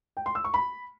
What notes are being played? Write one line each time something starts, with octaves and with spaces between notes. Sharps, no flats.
G5
C6
E6
C#6
B5